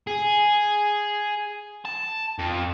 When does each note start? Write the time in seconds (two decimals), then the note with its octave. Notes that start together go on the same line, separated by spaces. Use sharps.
0.07 G#4
1.85 A5
2.39 F2